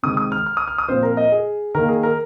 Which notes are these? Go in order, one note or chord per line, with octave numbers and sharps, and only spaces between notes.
C3 D#3 G#3 D#6
D#6
F6
F6
D#6
F6
D#6
A#2 F3 C4 C5
A#4
D#5
G#4
D#3 A#3 A#4
G#4
A#4